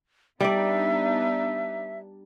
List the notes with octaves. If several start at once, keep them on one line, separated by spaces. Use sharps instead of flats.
G3 B3 D4 D#4 D5 E5